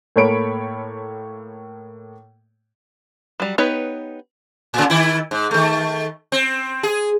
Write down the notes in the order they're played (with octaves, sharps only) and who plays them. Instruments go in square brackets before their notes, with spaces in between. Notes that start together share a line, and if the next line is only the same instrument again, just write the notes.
[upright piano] A2 A#3 A4 C#5 B5 D7
[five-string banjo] F#3 G3
B3 D#4 G4 B4 C#5
[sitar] A2 C#3
D#3 E4
G#2
D#3 A3
C4
G#4